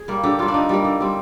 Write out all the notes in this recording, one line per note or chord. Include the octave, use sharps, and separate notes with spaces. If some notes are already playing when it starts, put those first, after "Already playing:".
Already playing: G#4
G3 A#3
D3 G4
G3 A#3 F4
D4
D3 D#4
G3 A#3
D3
G3 C4